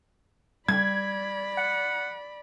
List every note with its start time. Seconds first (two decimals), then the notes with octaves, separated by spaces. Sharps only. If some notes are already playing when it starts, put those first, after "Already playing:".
0.68 G3 D5 B5 G#6
1.58 F#5